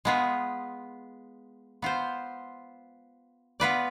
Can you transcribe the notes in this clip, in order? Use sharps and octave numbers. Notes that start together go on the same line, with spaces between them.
G#3 B3 F4 G#4
B3 F4 C5
B3 F4 B4 D5